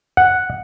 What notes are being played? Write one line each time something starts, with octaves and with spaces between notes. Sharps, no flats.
F#5